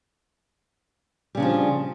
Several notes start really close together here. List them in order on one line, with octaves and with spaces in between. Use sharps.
G3 C#3 D4 F3